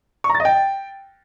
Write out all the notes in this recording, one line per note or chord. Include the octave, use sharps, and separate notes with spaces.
C#6
A#5
A6
D#5
G5